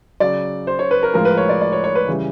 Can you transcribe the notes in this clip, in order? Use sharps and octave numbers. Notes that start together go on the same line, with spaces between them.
C#3 F#3 D5
C5
C#5
B4
A#4
A2 F3 G#3 A#4
B4
C#5
D5
D5
C#5
C#5
B4
C#3 E3 G3